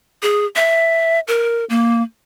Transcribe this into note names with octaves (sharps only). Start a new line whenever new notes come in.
G#4
E5
A#4
A#3